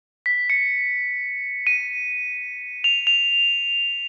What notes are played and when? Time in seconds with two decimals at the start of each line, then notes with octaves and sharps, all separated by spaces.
0.26 B6
0.50 C#7
1.67 D#7
2.84 F7
3.07 F7